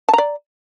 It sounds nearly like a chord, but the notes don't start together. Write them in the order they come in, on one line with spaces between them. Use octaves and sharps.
A5 A#5 D5